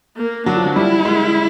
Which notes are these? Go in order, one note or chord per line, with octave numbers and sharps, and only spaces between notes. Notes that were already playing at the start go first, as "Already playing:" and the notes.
A#3
F#3 D4
F3
F#3
G3 E4
G#3